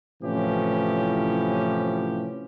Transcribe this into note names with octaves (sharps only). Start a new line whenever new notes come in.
A2 C3 E3 F3 C#4 G4